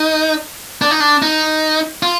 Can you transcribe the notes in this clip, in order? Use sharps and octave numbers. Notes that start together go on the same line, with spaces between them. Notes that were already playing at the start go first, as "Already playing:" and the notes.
Already playing: D#4
D4
D#4
D4
D#4
F4